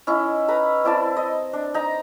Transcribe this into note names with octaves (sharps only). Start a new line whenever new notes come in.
C#4 D#4 E4
B4 A#5 B5
C4 E4 D5 A5
D#5
D4
D#4 A#5